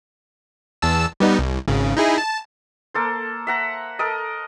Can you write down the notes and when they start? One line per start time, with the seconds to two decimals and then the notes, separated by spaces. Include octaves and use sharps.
0.82 E2 A5 E6
1.20 G3 B3 D#4
1.39 C2
1.68 G#1 C#3
1.97 D#4 E4 G#4
2.18 A5
2.94 A#3 A4 C5
3.47 E5 F#5 A#5
3.99 A4 A#4 D#5